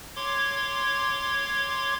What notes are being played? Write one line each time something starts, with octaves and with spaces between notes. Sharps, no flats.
C#5 C6 D6 G#6